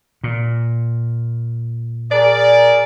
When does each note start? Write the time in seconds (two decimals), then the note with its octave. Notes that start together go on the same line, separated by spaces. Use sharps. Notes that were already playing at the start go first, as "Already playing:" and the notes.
0.24 A#2
2.12 G#4 A#4 D5